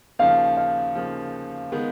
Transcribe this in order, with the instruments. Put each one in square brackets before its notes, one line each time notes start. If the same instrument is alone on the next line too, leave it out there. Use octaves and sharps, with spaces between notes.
[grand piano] D#2 C#3 F3 [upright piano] F5
[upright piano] F5
[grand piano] D#2 C#3 F3
D#3 G#3 B3